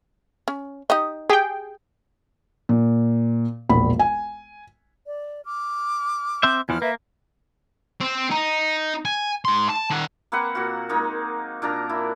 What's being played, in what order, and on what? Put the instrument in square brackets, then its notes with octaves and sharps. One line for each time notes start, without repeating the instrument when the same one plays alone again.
[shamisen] C#4
D#4 G4 D#5
[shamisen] G4 [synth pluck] G#4 G5
[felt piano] A#2
E1 A#1 B5
G#5
[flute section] D5
D6 F6
[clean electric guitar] C4 C5 E5
[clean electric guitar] E2 E3 F3 [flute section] F6 F#6
[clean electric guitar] A#3 [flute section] B4 E5
[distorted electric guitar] C4
D#4
G#5
G#2 C6
A5
D#3 F#5
[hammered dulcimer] A#3 C4 B4 F#5
A#2 F#4
G#3 A#3 D#4
A#2 D4 A#4 A#5
E4